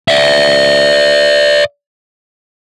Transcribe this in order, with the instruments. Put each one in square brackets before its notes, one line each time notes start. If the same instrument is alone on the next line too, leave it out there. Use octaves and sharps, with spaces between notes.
[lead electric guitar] D5 E5